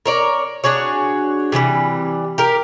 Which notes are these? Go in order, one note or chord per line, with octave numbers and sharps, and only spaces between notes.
A#4 C#5 D5
D4 F#4 G#4 C#5
C3 E3 F#3 G3
G4 A#4